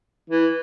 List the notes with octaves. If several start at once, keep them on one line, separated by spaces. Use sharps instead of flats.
E3